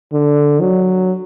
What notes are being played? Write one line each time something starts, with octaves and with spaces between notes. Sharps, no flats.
D3
F#3